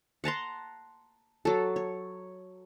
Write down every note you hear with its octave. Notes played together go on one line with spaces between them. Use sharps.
F#5 A5 A#5 C6
F#3 A4
C#5